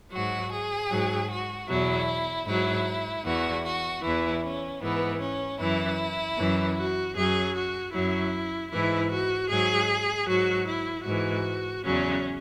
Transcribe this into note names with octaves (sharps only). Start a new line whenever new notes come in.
G#2 F#3 F#4
G#4
G#2 F#3
F#4
E2 B2 F#3 E4
G#2 F#3 E4
E2 E3 F#4
F#4
E2 E3 E4
C#4
G#2 E3 B3
C#4
F#2 E3 E4
F#2 E3
F#4
F#2 F#3 G#4
F#4
F#2 F#3 E4
G#2 E3 E4
F#4
G#2 F#3 G#4
G#2 F#3 F#4
E4
G#2 E3 F#4
E2 C#3 F#3 C#4